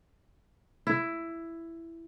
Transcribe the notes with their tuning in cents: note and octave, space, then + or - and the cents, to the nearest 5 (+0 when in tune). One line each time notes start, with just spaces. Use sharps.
E4 +10